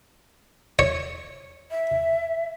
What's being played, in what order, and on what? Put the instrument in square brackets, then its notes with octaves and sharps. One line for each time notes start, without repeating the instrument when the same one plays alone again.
[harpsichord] C#5
[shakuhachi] E5